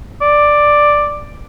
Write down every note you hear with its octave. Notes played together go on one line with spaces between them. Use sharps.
D5